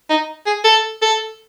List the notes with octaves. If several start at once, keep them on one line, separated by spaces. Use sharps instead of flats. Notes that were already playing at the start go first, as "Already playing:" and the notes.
D#4
G#4
A4
A4